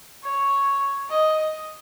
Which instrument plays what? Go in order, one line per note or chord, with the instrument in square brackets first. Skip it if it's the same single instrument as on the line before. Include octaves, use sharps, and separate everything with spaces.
[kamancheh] C#5
D#5